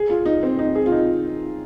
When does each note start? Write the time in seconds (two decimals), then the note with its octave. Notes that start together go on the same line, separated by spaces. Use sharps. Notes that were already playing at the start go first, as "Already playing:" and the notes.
Already playing: G#4
0.10 F4
0.26 D#4
0.43 C4
0.59 D#4
0.75 G#4
0.86 F4
0.92 D#4